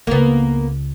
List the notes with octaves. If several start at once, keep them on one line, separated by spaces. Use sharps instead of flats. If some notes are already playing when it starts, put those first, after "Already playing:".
C#2 C#3 A#3 B3